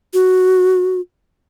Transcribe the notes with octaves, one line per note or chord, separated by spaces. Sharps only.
F#4